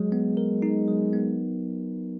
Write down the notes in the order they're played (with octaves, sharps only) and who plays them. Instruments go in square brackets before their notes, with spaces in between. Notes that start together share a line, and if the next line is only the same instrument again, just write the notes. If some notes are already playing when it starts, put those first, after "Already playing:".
Already playing: [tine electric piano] F#3 [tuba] G#3
[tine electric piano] B3
A#4
D#4
F#3
B3